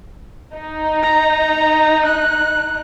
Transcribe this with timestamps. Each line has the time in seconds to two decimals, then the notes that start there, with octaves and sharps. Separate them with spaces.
0.56 D#4
1.03 A#5
2.05 F#6